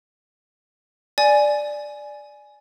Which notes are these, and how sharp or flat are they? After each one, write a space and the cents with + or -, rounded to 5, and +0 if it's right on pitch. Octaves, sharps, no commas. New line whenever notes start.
D5 +5 G#5 +5